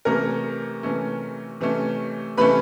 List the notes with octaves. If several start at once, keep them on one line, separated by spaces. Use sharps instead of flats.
C3 E3 A3 C#4 A#4 A#5
C3 E3 A3 C#4
C3 E3 A3 C#4
C3 E3 A3 C#4 B4 B5